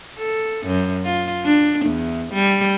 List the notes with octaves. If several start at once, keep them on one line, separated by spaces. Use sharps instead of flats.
A4
F#2
F4
D4
E2
G3